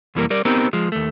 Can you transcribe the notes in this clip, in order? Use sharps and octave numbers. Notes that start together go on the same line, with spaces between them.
C2 F2 E3 G3 A#3 A#4
G3 A#4 D5
B3 C4 D#4 G4 A#4
F3 G#3
D#2 A3